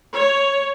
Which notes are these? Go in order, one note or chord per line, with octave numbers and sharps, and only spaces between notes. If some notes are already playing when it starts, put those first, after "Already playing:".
C#5